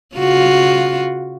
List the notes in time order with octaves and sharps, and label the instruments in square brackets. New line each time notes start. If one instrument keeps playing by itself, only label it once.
[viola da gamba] C#3 F4 F#4